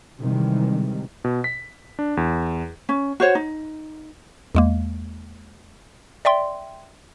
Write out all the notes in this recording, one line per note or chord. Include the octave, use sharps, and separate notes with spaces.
C3 D#3 E3 G3 G#3
B2
B6
D4
E2
C#4
F#4 C5 C#5
D#4
E2 G#3 A#3
D5 E5 G5 C6